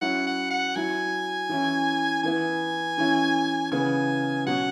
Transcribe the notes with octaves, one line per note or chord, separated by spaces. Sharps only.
F#3 C#4 E4 F#5
F#5
F#5
F#3 E4 G#5
E3 C#4 E4
E3 B3 E4 G#5
E3 C#4 E4
C#3 E3 B3 G#5
B2 F#3 C#4 F#5